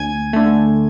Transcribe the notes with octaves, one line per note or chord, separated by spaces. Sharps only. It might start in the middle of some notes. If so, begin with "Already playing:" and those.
Already playing: D2 G#5 G#6
D3 A3